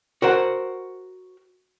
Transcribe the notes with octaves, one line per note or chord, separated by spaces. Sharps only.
F#4 A#4 C5 F#5